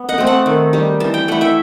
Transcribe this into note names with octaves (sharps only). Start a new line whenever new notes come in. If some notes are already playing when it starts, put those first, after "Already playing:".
Already playing: B3
D#5 F#5
A3 C4
F#5 A5
D#3
G3 D#4
E3 A5
G5
A3 E4 F#5
E5 G5